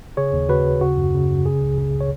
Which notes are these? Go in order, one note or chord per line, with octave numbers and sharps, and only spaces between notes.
C#3 G#4 C#5
D#2
C#3 F#4 B4
D#2
C#3 F#4
F#2
C#3
F#2
C#3 G#4
C#2
C#3
C#5